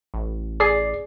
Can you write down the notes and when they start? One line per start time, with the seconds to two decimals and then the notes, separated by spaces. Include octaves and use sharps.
0.14 A1
0.60 G#4 D5 C7